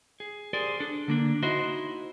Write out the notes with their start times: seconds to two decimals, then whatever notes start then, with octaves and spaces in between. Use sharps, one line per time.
0.20 G#4
0.53 G4 G#4 A#4 C5 D5
0.80 D4 A4
1.08 D3 A#3 D4
1.43 D#4 E4 F#4 C5 D#5 E5